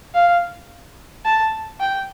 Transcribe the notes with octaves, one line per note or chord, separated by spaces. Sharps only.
F5
A5
G5